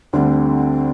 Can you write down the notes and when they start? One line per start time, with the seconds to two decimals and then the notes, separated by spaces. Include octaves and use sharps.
0.13 D2 D3 G3 C4 D4